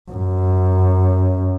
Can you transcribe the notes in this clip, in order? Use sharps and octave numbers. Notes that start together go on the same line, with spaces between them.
F#2